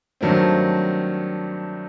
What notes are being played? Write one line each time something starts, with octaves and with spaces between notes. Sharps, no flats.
G2 D#3 F#3 A3 C4